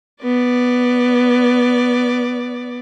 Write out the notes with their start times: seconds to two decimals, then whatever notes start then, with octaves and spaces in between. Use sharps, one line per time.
0.23 B3 D5